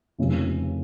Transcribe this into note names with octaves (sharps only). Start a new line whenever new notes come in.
F1 D#2 C#3 F3